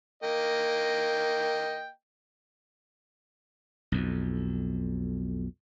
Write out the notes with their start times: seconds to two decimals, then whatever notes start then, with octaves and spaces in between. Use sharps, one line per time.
0.23 A#3 D#5 G5
3.92 B1 F2